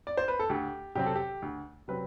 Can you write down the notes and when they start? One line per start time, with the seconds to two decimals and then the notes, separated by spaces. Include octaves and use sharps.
0.07 D5
0.17 C5
0.28 B4
0.39 A4
0.49 D2 G4
0.95 C3 F#3 C4 G4
1.06 A4
1.15 G4
1.42 D2
1.88 C3 F#3 C4 B4